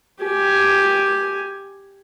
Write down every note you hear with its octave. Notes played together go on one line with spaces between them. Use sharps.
G4 G#5